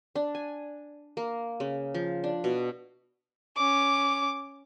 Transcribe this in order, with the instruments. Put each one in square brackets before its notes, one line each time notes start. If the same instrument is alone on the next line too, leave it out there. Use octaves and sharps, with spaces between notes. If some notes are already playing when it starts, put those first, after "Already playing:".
[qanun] D4
G#5
A#3
C#3
F3
D4
B2
[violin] C#4 D6